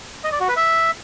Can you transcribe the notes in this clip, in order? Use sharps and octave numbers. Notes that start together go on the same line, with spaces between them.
D#5
D5
F#4
B4
E5